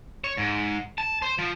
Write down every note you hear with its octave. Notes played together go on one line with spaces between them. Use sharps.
C#5
G#2
A5
C5
F3